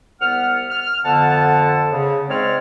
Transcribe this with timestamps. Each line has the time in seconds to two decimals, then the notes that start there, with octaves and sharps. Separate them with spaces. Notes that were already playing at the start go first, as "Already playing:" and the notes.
0.21 C2 B3 F#5 F6
0.70 F6
1.05 F2 D3 B3 F#5 A5
1.92 C#3
2.29 G#2 G#3 C4 C#5 D5 F6